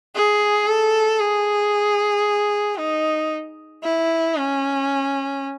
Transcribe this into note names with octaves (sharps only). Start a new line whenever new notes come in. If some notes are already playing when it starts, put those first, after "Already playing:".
G#4
A4
G#4
D#4
E4
C#4